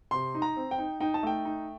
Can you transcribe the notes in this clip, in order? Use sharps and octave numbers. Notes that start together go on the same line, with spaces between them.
C3 C6
D#4
A#5
C4
G5
D#4
D#4 G5
A5
A3 G5
D#4